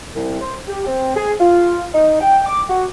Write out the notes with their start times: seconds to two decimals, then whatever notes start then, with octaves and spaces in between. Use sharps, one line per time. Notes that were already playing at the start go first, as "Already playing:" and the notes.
0.15 C2
0.41 C5
0.68 G4
0.86 C4
1.16 G#4
1.40 F4
1.94 D#4
2.21 G5
2.46 D6
2.69 F#4